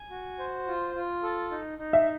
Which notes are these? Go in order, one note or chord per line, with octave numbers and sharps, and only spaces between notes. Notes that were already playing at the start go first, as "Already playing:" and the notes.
Already playing: G#5
F#4
C5
F4
F4
A4
D#4
D#4
E5